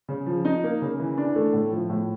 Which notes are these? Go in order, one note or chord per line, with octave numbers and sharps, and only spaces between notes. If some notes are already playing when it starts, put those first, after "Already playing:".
C#3
F3
D#4
A#3
C#3
E3
D4
A3
A2
F3
A2